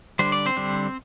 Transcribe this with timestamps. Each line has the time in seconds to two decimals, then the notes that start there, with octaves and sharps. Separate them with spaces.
0.19 D3 G3 D4 C5
0.32 D5
0.46 C4 C5
0.57 D3 G3 D4